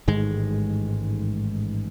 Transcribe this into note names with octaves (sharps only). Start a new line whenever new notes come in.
A1 G#2 D#3 G#3